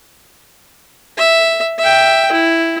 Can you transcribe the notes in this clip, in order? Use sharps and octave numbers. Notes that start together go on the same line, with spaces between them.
E5
E5 G5
E4